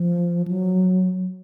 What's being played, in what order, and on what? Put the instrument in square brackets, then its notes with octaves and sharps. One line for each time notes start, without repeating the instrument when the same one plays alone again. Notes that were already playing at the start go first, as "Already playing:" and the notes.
Already playing: [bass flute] F3
F#3